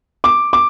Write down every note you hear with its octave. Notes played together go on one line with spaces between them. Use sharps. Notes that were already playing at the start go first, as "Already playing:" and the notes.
D6
D6